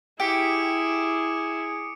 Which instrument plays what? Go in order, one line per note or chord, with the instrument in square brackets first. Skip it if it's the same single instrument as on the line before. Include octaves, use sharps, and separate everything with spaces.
[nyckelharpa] E4 [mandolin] G4 [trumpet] G#4 [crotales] D6 C#7 D7